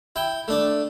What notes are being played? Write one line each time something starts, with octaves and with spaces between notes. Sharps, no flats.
E4 G5
A3 D4 D6